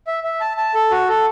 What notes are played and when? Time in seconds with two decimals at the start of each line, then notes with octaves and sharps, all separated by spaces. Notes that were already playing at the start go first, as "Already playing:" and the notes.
0.07 E5
0.24 E5
0.41 A5
0.57 A5
0.74 A4
0.91 F#4
1.09 A4